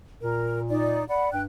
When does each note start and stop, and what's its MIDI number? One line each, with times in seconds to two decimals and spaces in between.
0.22 1.05 46
0.22 0.61 70
0.69 1.04 63
0.69 1.04 74
1.08 1.29 74
1.08 1.29 78
1.08 1.29 83
1.32 1.46 43
1.32 1.41 79
1.32 1.41 90